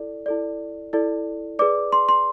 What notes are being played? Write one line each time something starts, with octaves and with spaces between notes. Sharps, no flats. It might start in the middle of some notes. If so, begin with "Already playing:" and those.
Already playing: E4 A4 D5
E4 A4 D5
E4 A4 D5
G#4 B4 D5 D6
C6
C6